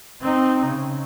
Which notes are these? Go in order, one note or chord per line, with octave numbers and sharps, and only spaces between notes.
C4 D#4
C#3